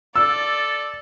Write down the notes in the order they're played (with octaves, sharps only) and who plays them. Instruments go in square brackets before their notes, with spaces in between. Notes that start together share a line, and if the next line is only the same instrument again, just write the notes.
[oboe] A4 [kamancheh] D5 [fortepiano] E6